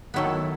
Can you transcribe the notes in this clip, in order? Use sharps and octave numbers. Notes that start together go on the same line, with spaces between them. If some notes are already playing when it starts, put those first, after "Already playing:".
D#3 F#3 B3 E4 A4